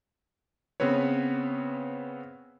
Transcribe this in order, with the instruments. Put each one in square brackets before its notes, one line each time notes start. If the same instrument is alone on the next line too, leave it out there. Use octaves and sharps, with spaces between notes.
[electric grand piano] C#3 B3 C4 B4 C#5